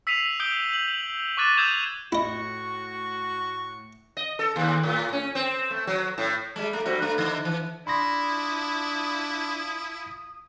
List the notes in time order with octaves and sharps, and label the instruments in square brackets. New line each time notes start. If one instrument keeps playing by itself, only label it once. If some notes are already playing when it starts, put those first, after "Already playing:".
[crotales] E6 B6 C7 D#7 F7
D#6 G6 D7 F7 G7
F#7
C#6 D6 F#6 A6 D#7 E7
D#6 E6 G6 G#6 E7 F7
[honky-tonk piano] A2 [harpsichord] E4 D#5 [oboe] F#4 [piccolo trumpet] C#6
[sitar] D#5
A4
D#2
A2
C#4
C4
A3
F#3
A2
G3 G#3
A3
G3 C4 F#4
G2 A3
D3
E3
[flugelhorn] D4 [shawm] E4 [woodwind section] F4 A5 D#6 [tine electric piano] B5 C6 A#6